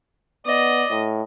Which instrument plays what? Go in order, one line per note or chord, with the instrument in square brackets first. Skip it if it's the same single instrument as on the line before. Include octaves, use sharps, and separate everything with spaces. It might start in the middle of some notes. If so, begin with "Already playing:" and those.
[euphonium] B3 [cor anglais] D5 [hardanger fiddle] D#5
[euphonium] A2